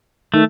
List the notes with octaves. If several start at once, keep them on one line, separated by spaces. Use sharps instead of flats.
D#3 A3